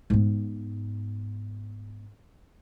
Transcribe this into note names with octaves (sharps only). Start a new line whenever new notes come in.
G#2 B3